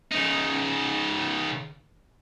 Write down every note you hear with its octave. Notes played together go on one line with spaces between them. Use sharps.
C#3 D#4